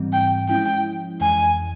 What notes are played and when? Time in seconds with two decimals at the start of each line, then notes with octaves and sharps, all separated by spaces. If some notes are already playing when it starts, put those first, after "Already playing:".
Already playing: G#2 E3 G3 C4
0.13 G5
0.49 F3 G#3 C#4 E4 G5
1.21 F2 E3 G#3 G#5